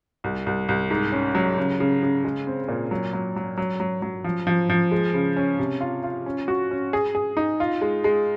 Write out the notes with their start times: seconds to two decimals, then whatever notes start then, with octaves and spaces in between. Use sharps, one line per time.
0.24 C2
0.46 C2
0.69 C2
0.90 G#2
1.12 C#4
1.35 F#3
1.58 C#3
1.80 C#3
2.03 C#3
2.24 G#3
2.47 C4
2.68 A#2
2.91 F#3
3.13 F#3
3.36 F#3
3.57 F#3
3.80 F#3
4.02 F#3
4.24 F3
4.47 F3
4.70 F3
4.91 G#3
5.14 C#3
5.37 C#4
5.59 C3
5.81 F4
6.03 F4
6.26 C#4
6.48 F#4
6.71 C#4
6.93 G#4
7.15 G#4
7.37 D#4
7.60 F4
7.81 G#3
8.04 G#3